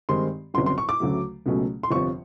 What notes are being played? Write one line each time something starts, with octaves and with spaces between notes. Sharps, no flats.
G2 D#3 G#3 C4 C6
G1 F2 C#3 F#3 C6
C6
C#6
D6
D2 C#3 F#3 A3
C#2 B2 F#3 A3 C#4
C6
G1 F2 C3 F3 C#6